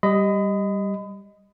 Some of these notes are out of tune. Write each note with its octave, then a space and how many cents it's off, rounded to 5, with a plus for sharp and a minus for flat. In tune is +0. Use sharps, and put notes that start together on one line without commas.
G3 +0 D#5 +0 B5 +35